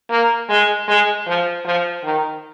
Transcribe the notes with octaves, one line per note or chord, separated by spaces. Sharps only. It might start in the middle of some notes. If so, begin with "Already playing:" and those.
A#3
G#3
G#3
F3
F3
D#3